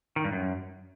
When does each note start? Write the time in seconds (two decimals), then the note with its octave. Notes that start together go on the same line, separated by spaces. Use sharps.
0.16 D#3
0.24 G2
0.33 F#2